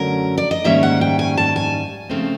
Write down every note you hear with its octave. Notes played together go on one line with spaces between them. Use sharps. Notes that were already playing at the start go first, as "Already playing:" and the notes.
Already playing: F#2 D3 F#3 A3 C#4 A#4
D5
D#5
G#2 D#3 G3 A#3 C#4 E5
F#5
G5
G#5
A5
G#5
C#3 F3 A3 C4